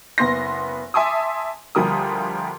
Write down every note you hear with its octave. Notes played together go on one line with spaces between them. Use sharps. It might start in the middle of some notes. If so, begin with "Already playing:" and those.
F#1 B3 C6 A#6
E5 G#5 A5 C6 D6 D#6
D2 F3 G3 A#4 D#6